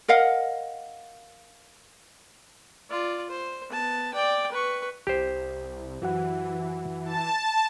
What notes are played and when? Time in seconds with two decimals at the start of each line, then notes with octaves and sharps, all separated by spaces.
0.08 A#4 D#5 F5 F#5
2.90 F4 D5
3.30 C5
3.69 B3 A5
4.14 D5 G5
4.52 B4 C#6
5.07 C2 G4 C5
6.02 F#2 E3 F#4 F#5
7.05 A5